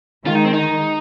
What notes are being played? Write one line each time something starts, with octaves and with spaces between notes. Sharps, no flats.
D#3 G#3 F4
D#4
C4
D#4